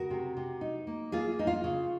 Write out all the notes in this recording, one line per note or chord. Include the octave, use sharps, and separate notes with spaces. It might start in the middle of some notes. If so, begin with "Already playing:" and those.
Already playing: C#3 F#4 A#4
C3
C3
D#4
A#3
A#3 F4 G#4
A#3 D#4
F4
C#3